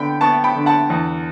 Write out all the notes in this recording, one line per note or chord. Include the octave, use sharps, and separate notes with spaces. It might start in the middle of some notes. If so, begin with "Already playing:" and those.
Already playing: D3 B3 G5 B5
B3 A5 C#6
G5 B5
D3
F#5 A5
E2